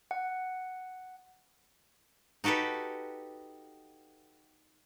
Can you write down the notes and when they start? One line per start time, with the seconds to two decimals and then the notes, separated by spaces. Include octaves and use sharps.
0.11 F#5
2.44 D#4 F#4 G4 A4 B4